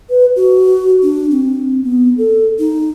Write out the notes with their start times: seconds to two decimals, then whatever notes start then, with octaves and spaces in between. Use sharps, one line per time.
0.10 B4
0.36 F#4
1.03 D4
1.31 C4
1.83 B3
2.18 A4
2.59 D#4